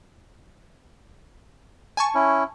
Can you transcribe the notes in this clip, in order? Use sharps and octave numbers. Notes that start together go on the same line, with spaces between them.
G#5 A5 C#6
C#4 E4